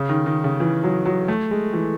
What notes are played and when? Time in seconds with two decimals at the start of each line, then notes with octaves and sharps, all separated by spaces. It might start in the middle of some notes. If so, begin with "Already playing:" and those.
Already playing: C#3
0.09 D#3
0.26 D#3
0.44 C#3
0.60 E3
0.84 F#3
1.06 F#3
1.28 A3
1.51 G#3
1.73 E3